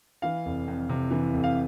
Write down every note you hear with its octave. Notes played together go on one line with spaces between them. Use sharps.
E3 F5
F1
F2
C3
E3
F1
F5